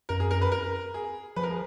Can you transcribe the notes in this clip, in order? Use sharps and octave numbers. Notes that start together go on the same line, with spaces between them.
F#2 A#4
G#4
A#4
B4
A#4
G#4
F3 B4
A#4
G#4